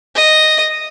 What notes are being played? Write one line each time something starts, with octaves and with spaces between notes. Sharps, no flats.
D#5